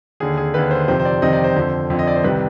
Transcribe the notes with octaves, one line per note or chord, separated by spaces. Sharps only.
D#2 D3 G#4
G#4
D#2 D3 B4
C5
F2 C3 D#3 C5
C5
D5
F2 C3 D#3 D#5
D5
C5
F2 D3
F2 D3
D#5
D5
C5
C2 C3 D#3 B4